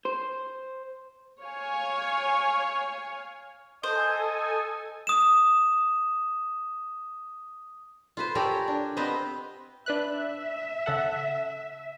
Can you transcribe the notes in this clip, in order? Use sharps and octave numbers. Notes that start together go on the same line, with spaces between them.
C5
C#5 F5 G#5
A4 C5 D#5 G#5
D#6 E7
F4 B4 C5
G4 A4 A#4 C#5 D5 G#5
D4
B3 C4 G4 B4 D#5 F5
D4 B4 E5 F#6
C#3 A4 F#5